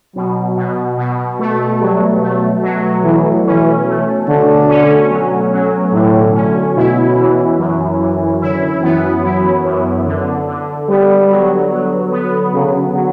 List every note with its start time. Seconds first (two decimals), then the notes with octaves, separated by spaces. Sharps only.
0.16 B2 F#3
0.57 B2
0.98 B2
1.39 A3
1.81 F#3 G3
2.22 A3
2.63 F#3
3.05 B2 E3
3.46 E3 C#4
3.87 A3
4.28 D3 A3
4.69 C#4
5.11 F#3
5.53 F#3
5.93 A2 D3
6.34 C#4
6.76 B2 E4
7.18 E3
7.58 F#2
8.01 E3
8.41 D3 E4
8.82 E3 B3
9.23 F#3 E4
9.65 F#2
10.06 D3
10.48 D3
10.89 G3 B3
11.30 F#3
11.71 F#3
12.12 B3
12.54 C#3 F#3
12.95 F#3